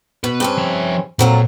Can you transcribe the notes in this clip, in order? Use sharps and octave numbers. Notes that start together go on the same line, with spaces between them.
B2 B4
G2 C4 C#4
F3 E5
F2 A#2 F#3 A#5